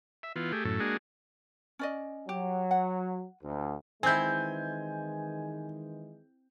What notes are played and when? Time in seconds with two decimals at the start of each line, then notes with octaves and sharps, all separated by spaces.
0.23 E5
0.36 E3 B3 F4
0.52 A3 G4 G#4
0.65 F#2 A2 A4
0.80 G#3 A#3 D4 F#4 G#4
1.79 C#4 D5 D#5
2.29 F#3 G4
2.71 F#5
3.43 D2
4.03 D#3 E3 G#3 C4 E4 G#5 G6